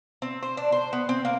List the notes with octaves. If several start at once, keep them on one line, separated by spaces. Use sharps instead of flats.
C4
C5
D4
C5
B3
C4
A#3